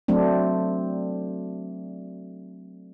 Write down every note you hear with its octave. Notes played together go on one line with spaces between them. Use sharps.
F#3 A3 C4 D4